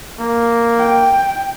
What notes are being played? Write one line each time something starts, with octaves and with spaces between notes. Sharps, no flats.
A#3
G5